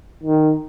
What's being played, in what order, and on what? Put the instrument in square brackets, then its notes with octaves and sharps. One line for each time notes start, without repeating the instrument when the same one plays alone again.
[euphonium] D#3